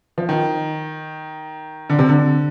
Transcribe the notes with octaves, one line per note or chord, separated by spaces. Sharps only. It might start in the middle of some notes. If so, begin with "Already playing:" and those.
F3
D#3
D3
C3
D3